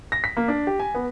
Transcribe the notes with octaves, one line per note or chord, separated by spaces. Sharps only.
A#6
B6
A#3
D4
G4
G#5
B3